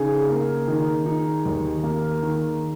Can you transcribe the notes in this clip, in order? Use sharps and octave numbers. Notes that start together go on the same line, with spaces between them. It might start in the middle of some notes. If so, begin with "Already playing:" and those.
Already playing: C#3 D#4 G#4
A#3
D#3
D#4
D#2
A#3
D#3